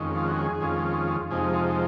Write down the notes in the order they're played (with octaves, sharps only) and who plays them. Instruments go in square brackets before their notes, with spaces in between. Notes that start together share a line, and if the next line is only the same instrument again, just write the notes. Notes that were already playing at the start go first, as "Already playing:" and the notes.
Already playing: [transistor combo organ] F2 D#3 G#3 C#4
F4
F#4
G#4
F2 D#3 G#3 C#4 F4
F2 C3 F3 G#3 D#4 G#4
F4